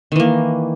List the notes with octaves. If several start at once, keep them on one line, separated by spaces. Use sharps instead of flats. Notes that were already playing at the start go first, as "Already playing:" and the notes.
D#3 E3 A#3